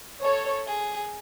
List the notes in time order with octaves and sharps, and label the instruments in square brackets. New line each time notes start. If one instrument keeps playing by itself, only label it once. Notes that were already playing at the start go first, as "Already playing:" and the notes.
[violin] A4 [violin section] C#5
[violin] G#4